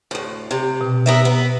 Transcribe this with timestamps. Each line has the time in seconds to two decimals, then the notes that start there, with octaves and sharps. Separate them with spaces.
0.11 D2 A2
0.51 C3
0.81 B2
1.06 B3 A#4 E5
1.25 B3